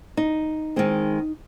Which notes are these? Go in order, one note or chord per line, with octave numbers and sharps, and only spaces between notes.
D#4
D#3 G#3 C4